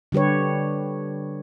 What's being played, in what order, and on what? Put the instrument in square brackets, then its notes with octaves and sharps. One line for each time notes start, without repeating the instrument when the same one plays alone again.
[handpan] D3 G3 G4 B4 C#5